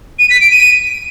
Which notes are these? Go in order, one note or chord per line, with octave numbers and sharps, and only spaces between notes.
D#7
B6
D7
D#7